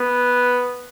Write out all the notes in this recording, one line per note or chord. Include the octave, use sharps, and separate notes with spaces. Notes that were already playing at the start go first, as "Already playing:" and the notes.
Already playing: B3